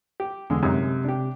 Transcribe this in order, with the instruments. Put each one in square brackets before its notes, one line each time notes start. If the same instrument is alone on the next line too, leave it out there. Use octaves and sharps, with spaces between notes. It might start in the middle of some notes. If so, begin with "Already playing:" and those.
[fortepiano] G4
[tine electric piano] E2 [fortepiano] D3 G#3
[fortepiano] F#2 G#3 D#4 [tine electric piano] C3
[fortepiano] D4 G4